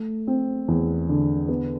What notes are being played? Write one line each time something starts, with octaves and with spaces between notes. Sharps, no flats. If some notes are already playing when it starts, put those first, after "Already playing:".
Already playing: A3
C4
E2
D3
B3